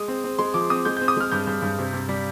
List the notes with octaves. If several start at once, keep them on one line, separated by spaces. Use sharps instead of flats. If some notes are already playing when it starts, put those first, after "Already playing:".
Already playing: G#3 D#6
C4
C4
G#3 C6
F3 D6
C4 D#6
G#3 G6
C4 G6
D#6
G#3 F6
G2 G6
G2
G2
C3
C3
G3